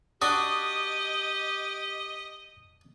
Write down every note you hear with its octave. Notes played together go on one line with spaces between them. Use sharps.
D4 F#4 G4 D#5 D#6